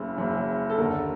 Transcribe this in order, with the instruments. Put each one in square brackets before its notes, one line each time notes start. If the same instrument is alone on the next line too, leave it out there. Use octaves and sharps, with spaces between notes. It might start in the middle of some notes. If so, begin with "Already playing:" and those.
Already playing: [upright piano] F#1 F#2 C#3
F#1 F#2 C#3
A4
D#2 D3 A#4